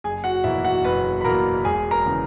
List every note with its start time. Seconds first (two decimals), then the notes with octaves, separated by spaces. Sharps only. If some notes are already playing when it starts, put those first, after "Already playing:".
0.04 F#1 G#4 G#5
0.24 F#4 F#5
0.44 E2 B2 A#3 E4 E5
0.65 F#4 F#5
0.84 F#1 B4 B5
1.21 B5
1.25 E2 B2 A#3 A#4 A#5
1.65 E1 G#4 G#5
1.91 A#4 A#5
2.06 C#3 E3